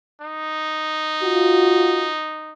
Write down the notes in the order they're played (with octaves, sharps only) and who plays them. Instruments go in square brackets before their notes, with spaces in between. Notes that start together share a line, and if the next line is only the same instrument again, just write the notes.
[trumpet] D#4
[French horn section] F4 F#4